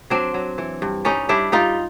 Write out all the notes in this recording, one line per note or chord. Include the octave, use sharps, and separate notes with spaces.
F#3 C4 D4
F#3
E3
G2
G3 C#4 D#4
G3 D4 E4
G3 D#4 F4